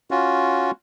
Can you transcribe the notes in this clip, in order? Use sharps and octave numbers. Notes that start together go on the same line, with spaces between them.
C#4 F4 F#4